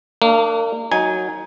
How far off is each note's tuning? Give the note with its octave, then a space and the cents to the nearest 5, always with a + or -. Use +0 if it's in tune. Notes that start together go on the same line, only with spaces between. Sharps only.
A#3 -30 D4 +30
F#3 +0 D#4 +15 G#5 -5